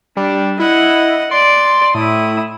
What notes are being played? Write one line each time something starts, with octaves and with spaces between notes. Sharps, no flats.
G3 D4
E4 D#5 F#5
D5 C6
A2 E4 D#6